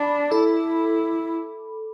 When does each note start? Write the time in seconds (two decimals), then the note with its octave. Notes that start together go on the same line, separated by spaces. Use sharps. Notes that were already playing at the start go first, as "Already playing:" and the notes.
Already playing: D4 B5 D6
0.31 E4 A4